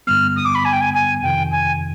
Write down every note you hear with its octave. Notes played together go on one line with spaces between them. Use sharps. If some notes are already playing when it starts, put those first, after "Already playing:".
G2 D3 G3 B3 F6
D#6
D6
B5
G#5
G5
G#5
G#5
F2 C3 D#3 G5
G#5